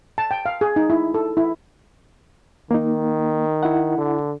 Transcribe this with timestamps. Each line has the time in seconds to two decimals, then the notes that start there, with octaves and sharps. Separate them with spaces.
0.18 A5
0.31 G5
0.46 F5
0.61 G#4
0.76 D#4
0.90 E4
1.14 A4
1.37 E4
2.71 D#3 A#3 D#4
3.63 E4 F#5
3.98 D3